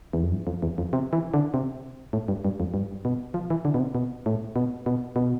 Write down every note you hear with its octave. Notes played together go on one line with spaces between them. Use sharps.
E2
F2
G2
F2
E2
F2
C3
E3
D3
C3
A2
G2
G2
F2
G2
B2
F3
E3
D3
B2
C3
B2
A2
B2
B2
B2